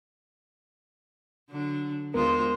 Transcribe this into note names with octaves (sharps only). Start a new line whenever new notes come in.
D3 F#3 D4
D#2 G#3 B3 F4 A#4 C5